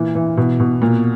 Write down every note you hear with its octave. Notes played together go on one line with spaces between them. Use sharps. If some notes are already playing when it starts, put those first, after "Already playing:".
Already playing: A#2 E3
E3
B2
B2
A#2